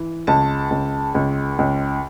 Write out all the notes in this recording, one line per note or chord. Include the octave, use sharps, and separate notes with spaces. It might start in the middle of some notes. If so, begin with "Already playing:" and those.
Already playing: E3
C#2 A5
C#2
C#2
C#2